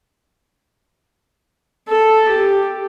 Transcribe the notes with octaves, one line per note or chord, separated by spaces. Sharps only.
A4
G4